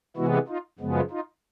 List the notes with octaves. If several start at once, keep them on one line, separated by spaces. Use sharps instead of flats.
C3 E3 G#3 B3 E4 F#4
D#4 F4
F#2 C#3 F3 G#3 B3
D#4 F4